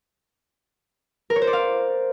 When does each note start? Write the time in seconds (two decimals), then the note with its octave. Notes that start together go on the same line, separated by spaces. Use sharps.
1.30 A#4
1.36 C#5
1.42 C5
1.47 D5
1.53 F5